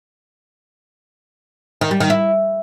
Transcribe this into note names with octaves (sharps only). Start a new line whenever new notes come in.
D#3
G3
D#3
E4